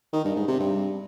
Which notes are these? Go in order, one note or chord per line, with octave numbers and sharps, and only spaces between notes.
D#3
G2
G#2
C3
G2